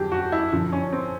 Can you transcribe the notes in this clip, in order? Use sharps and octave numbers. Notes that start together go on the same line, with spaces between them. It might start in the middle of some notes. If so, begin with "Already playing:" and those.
Already playing: F2 D3 F#3 G4 G#4
F#4
E4
F#2 D3 F3
C#4
C4